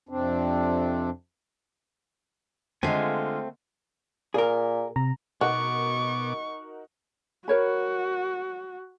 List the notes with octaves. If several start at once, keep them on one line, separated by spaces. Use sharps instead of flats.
F2 C3 C4 D4
D3 G#3 A3 C4 F4 F5 G#5
A#2 G#4 A#4
C3 A#5
B2 B3 D#4 F#4 A#4 C#6 D6
F#4 A#4 C#5 B5